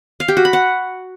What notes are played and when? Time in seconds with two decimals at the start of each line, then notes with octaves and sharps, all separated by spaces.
0.20 F5
0.28 G4
0.37 F#4
0.45 B5
0.53 F#5